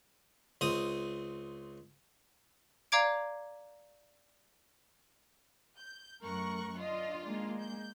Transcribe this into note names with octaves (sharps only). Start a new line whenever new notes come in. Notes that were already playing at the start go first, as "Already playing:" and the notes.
C#2 C4 D#6
D5 F5 A#5 D6 G#6 D7
G6
F#2 A3 A#4 C#6 F#6
D#3 D4 F4 D#5
G#3 A#3
G6